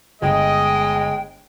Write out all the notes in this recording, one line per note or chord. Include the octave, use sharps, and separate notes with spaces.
G1 G#3 D#5 G5